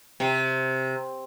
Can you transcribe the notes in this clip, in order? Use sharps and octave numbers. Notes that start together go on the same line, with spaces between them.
C3